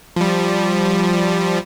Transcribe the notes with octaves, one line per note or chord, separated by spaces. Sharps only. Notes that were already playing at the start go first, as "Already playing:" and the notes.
F3 G3